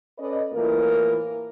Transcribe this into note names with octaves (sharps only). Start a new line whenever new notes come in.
C#4 A4 B4 D5 D#5
A2 E3 A#3 F4 A#4